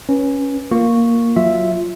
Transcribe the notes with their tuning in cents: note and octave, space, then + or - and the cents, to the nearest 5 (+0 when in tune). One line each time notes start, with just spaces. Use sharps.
C#4 +0 B4 -20
A#3 +0 F4 +0 C#6 +0
F#3 +0 F4 -5 E5 +0